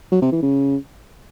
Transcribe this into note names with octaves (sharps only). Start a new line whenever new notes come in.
F#3
C3
E3
C#3